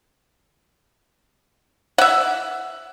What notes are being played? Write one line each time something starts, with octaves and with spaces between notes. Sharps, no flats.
E5 F#5